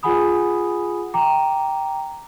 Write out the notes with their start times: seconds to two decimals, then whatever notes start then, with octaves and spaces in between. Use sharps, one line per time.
0.03 F4 G#4 F#5 G#5 B5 D#6
1.14 G5 A#5 D6